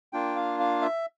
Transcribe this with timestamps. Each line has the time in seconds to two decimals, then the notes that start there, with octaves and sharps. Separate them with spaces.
0.13 A#3 D4 F4 G5
0.36 F5
0.60 F5
0.82 E5